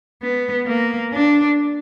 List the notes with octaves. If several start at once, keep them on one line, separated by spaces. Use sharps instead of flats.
B3
A#3
D4